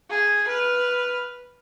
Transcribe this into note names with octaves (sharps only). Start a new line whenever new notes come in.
G#4
B4 F6